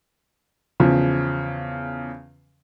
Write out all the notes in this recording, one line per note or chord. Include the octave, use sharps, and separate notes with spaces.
E2 C#3 F3